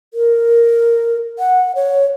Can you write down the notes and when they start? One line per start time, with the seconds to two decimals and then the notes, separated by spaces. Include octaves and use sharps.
0.14 A#4
1.39 F#5
1.76 C#5